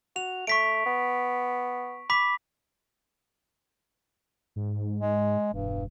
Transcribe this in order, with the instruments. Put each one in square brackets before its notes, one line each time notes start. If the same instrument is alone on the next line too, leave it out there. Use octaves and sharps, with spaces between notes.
[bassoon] F#4 [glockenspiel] F7
[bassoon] A3 [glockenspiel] C#6 B6 D7
[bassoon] B3
[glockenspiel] B5 D6 B6
[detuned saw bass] G#2
[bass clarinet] G#3
[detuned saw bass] E1 [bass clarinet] G2